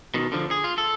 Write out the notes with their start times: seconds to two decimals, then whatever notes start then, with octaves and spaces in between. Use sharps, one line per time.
0.14 B2 D#3
0.32 D3 F3
0.51 G#4
0.64 F4
0.78 A4